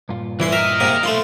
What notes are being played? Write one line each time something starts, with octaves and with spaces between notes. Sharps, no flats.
G2 A#2 F4
C2 E3 E4 C6
A#4 D#5 E5
G#2 C3 A#3
B1 A3 F4 C6